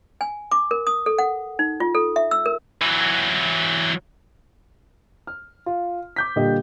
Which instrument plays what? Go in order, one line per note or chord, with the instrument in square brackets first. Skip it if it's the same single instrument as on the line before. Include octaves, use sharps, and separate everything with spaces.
[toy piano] G#5
D6
A#4
D#6
A4
F#5
D#4
F4
A4
E5
E6
A#4
[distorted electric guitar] E3 F#3
[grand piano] F6
F4
D6 G6 B6
A#2 D3 G3 G4 D#5